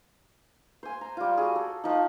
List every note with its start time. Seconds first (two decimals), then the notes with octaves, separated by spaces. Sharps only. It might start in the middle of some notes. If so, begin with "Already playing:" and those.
0.83 C5 G#5
1.01 A#5
1.17 G3 F4
1.37 F#4 G#4
1.56 A4
1.84 F3 D#4